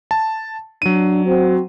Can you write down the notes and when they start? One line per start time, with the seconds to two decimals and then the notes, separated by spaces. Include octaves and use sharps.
0.11 A5
0.82 F#3 D4 D#7
1.25 C4 F#4